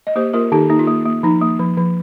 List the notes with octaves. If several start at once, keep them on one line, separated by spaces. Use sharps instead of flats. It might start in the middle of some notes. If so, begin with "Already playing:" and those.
D#5
A#3 G4 C5
A#3 F4 A#4
D#3 D#4 G4
A#3 D#4
F4
A#3
A#3
F3 D#4
A#3
F3
F3